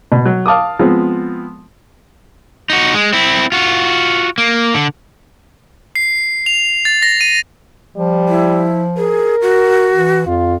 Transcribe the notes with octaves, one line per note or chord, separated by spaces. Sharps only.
B2
F#3
F5 A5 D6 D#6
F3 G#3 B3 C4
D#4 F#4
G#3
C4 E4
F4 F#4
A#3
D3
C7
F7
A6
A#6
D#7
F3 G3
E4
G#4 A#4
F#4
E3
F2 F4